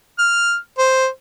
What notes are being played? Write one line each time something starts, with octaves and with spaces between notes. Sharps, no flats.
F6
C5